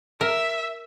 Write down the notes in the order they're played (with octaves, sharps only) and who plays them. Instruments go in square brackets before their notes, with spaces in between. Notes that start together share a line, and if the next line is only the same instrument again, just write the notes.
[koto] A#4 [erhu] E5